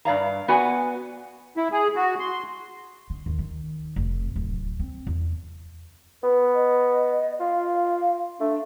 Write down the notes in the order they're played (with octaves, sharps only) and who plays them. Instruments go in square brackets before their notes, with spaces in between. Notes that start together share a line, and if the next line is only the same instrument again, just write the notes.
[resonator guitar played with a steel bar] G2 D5 F5 A#5
B3 F#4 D5 G#5
[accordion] E4
G#4
F#4
C6
[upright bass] D3
D#2
D#3
F1
D1
C4
E2
[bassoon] B3 [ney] B4
[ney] D#5
[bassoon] F4 [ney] F5
[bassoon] A3 [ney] D4